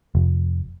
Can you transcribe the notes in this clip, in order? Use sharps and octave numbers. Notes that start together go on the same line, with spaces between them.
F1